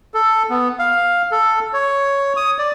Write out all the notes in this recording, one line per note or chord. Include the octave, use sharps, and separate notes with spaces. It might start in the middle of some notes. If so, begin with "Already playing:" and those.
A4
B3
F5
A4
C#5
D#6
D5